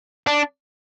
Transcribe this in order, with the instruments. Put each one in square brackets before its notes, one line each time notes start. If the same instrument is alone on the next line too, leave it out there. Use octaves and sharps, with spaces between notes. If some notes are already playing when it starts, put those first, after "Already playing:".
[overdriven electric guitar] D4